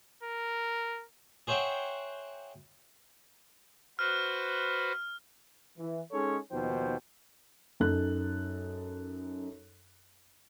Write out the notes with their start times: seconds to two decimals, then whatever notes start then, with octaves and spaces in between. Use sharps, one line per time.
0.23 A#4
1.47 G#4 C5 C#5 E5 F#5 G5
3.99 F#4 B4 C5 F6
5.78 E3
6.12 G#3 C#4 D#4 G#4 A4 C#5
6.50 D#2 B2 F3 D#4 C5 G5
7.80 F#2 D#4 A4 F#6